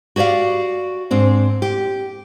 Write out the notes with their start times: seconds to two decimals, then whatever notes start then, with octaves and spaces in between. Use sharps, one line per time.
0.16 F#4 G4 C#5 D5 F5
1.11 G#2 C4 D4
1.62 G4